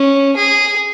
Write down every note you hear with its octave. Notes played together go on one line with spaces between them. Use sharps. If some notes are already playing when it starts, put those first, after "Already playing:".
Already playing: C#4
G#4